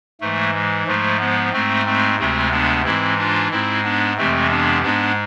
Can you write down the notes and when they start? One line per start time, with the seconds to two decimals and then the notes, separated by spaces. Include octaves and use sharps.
0.21 G#2 E3 G#3 A3
0.54 G#3
0.87 G#2 F3 G#3 A3
1.20 G#3 B3
1.53 G#2 G#3 A3 C4
1.86 A3 C4
2.19 D2 C3 G#3 A3 C4
2.52 B3 D4
2.85 G#2 E3 G#3 C4 E4
3.18 D4 F4
3.51 G#2 G#3 C4 E4
3.84 B3 D4
4.17 F2 C3 E3 G#3 A3 C4
4.50 B3 D4
4.83 G#2 G#3 B3 D4